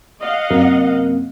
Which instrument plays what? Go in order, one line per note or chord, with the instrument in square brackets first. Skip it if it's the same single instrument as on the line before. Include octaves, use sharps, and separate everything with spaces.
[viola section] D#5 F5 F#5
[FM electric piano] F#2 C3 A#3